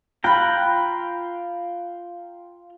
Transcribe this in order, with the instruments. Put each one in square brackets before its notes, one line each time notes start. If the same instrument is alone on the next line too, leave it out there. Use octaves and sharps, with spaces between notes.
[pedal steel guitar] F4 G5 A#5 [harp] B5 F#6